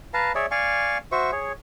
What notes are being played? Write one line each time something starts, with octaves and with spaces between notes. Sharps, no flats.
B4 F5 A5 A#5
G#4 C#5 D5 E5
D5 F5 G#5 C#6
F#4 C5 E5 C#6
G#4 C#5